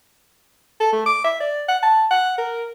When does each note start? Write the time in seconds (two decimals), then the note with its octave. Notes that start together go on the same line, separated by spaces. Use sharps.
0.80 A4
0.92 A3
1.06 D6
1.24 E5
1.40 D5
1.68 F#5
1.82 A5
2.11 F#5
2.38 A#4